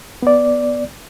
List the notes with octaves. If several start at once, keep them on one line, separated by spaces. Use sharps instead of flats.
B3 D5